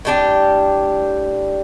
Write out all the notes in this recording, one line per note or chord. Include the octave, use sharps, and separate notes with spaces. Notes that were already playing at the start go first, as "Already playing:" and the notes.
A2 G3 D4 G4